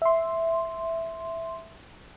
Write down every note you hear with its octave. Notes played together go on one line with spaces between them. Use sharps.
E5 C6